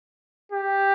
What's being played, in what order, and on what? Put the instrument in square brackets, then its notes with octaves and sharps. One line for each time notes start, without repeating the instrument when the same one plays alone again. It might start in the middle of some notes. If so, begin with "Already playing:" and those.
[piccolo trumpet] G4